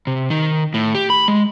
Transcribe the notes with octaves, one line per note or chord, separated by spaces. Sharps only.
C3
D#3
A2
G4
B5
G#3